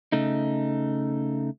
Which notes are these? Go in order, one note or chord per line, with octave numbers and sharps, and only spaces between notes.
C#3 A3 D#4